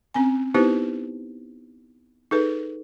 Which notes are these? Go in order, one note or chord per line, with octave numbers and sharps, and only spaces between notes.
C4 C#4 G#5
B3 D#4 E4 G4 B4 C5
D#4 G#4 A4 B4